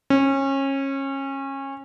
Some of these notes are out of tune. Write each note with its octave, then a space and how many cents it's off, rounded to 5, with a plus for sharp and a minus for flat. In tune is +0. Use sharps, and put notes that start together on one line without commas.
C#4 -25